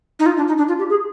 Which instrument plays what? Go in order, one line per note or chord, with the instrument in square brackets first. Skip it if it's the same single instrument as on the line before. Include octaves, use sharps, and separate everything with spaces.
[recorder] D#4
F4
D4
D#4
D4
F4
G4
G#4